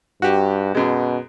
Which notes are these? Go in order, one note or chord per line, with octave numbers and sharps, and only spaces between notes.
G2 F#4 G4
F#2 B2 G#3